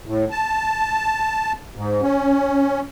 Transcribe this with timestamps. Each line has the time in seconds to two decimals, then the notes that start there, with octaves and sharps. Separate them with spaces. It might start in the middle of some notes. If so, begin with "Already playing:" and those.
0.06 A2
0.31 A5
1.76 G#2
2.02 C#4